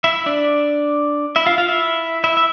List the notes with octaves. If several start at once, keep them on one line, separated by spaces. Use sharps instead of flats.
E4 E5
D4 D5
E4 E5
F4 F5
F4 F5
E4 E5
E4 E5
E5